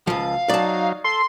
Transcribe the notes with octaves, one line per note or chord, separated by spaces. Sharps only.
C#2 F3 F5
F#3 D#4 D5 A5
A4 C6